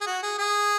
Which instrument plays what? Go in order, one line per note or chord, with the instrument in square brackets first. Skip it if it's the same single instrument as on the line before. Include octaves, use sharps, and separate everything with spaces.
[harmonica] G#4
F#4
G#4
G#4